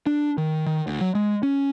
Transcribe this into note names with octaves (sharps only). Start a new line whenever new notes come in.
D4
D#3
D#3
D2
F#3
G#3
C#4